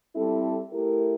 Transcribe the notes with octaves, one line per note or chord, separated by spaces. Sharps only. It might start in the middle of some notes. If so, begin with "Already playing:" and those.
G3 C4 E4 A4
A3 E4 G4 A#4